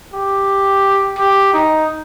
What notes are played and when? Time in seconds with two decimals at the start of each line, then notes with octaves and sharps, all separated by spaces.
0.14 G4
1.18 G4
1.54 D#4